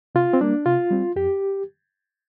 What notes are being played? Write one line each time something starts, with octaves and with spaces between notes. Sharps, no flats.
C3 F4
C4
G3 A#3 D4
C3 F4
G3 C4
F2 G4